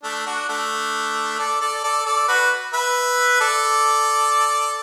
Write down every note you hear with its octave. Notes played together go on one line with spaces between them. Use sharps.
A3 D4
D4 F#4
A3 D4
A4 D5
A4 D5
A4 D5
A4 D5
F#4 B4
B4 E5
A4 D5